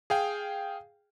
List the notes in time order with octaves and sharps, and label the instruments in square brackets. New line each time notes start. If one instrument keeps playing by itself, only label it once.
[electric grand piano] G#4 F5 G5